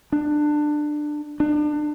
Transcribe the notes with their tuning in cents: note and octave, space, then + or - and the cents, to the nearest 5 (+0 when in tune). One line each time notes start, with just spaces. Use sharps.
D4 +20
D4 +30